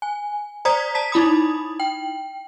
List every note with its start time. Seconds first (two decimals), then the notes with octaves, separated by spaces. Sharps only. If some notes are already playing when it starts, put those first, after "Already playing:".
0.02 G#5
0.65 C5 D5 A#5 D#6 G#6 B6
0.95 A5 A#5 B6
1.12 D#4 E4 B5 D#6
1.80 G5